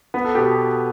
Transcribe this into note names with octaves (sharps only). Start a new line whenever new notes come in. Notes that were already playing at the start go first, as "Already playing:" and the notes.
B3 B4
A4
B2 G4